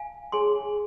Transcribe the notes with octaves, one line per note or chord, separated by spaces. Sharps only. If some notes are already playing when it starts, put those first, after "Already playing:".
Already playing: F5 G#5
G#4 C#5 G#5 C6